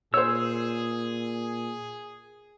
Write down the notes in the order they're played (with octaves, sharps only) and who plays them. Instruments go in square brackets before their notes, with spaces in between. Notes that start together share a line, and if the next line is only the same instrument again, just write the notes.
[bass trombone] A#2 [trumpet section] G#4 [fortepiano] C5 C#5 [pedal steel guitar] E6